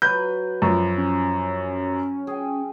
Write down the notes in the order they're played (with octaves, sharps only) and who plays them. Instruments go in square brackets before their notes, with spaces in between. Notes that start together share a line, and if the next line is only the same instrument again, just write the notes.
[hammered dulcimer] F#3 B4 [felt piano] G6
[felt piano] F#2 F3
[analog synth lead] C#4
[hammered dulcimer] G#4 G5